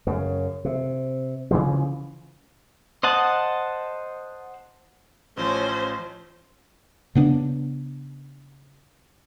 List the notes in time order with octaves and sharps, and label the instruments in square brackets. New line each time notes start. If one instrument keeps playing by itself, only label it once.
[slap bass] F#2 C#3
C3
C#3 E3 F3
[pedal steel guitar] C5 D#5 F#5 A5
[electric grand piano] A1 F3 [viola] C#4 C5
[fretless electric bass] C#3 B3 D4